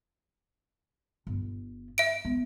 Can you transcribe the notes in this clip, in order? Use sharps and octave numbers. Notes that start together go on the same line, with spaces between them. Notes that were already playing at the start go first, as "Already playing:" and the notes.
G1
E5 D7
B3